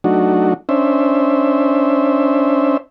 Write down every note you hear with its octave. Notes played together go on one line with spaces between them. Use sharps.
F#3 A3 D4 D#4 F#4
C#4 D4 C5 E5